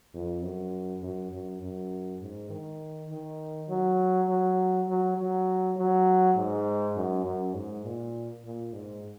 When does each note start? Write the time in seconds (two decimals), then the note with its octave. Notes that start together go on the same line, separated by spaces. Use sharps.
0.14 F2
0.42 F#2
1.03 F#2
1.32 F#2
1.62 F#2
2.21 G#2
2.50 D#3
3.10 D#3
3.69 F#3
4.29 F#3
4.88 F#3
5.17 F#3
5.77 F#3
6.37 G#2
6.96 F#2
7.25 F#2
7.54 G#2
7.85 A#2
8.44 A#2
8.73 G#2